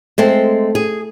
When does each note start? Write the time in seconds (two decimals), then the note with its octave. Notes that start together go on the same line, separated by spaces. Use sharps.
0.18 G#3 A3 C4
0.75 G#4